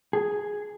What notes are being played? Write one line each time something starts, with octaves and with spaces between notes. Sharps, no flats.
G#4